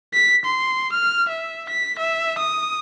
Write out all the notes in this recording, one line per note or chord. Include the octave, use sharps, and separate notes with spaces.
B6
C6
F6
E5
B6
E5
D#6